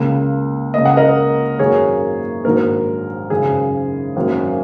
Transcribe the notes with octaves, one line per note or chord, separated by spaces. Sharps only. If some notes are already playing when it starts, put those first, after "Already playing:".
Already playing: C#2 C#3 A#3
C#2 C#3 A#3 D#5
F#5
A#4 D#5
G#1 F#2 F#3 A#3 G#4 C#5
A#1 G#2 D#3 F#3 A#4
G#1 F#2 C#3 G#4
G#1 F#2 F#3 A#3